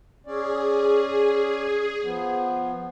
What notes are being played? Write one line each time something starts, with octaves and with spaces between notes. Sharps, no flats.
C#4 G#4 D5
F3 B3